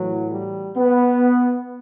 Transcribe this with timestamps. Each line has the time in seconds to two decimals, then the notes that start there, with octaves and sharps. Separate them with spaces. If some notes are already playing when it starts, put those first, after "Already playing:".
Already playing: A2 E3 F#3
0.32 G3
0.77 B3